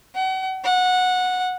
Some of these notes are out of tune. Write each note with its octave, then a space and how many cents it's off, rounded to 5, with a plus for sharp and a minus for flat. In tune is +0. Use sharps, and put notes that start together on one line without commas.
F#5 +40
F#5 -15